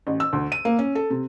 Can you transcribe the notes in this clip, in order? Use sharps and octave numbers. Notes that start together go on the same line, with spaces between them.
A1
E6
D2
D#7
A#3
C#4
A4
C3